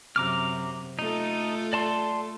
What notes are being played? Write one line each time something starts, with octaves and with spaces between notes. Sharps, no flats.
F#2 C3 A#5 D6 F6
A3 D#4 F4 A4
D5 A5 C6